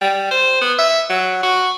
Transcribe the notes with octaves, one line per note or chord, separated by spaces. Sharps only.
G3
C5
B3
E5
F#3
F#4